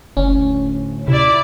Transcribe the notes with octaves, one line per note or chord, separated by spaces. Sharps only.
F#1 D2 A2 C#4
C3 E4 D5